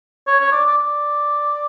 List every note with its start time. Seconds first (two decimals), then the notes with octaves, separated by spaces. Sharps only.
0.27 C#5
0.40 C#5
0.52 D5
0.66 D5
0.78 D5